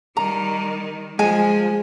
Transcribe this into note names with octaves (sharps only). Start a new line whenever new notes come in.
D#3 G3 A#5
F3 G#3 G#5